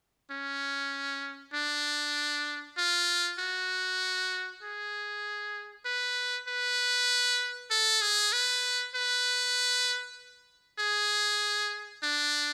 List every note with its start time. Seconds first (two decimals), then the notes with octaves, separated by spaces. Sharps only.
0.31 C#4
1.54 D4
2.77 F4
3.39 F#4
4.63 G#4
5.85 B4
6.48 B4
7.71 A4
8.02 G#4
8.33 B4
8.95 B4
10.79 G#4
12.03 D4